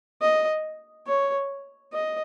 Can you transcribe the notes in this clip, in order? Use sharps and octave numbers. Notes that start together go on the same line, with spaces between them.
D#5
C#5
D#5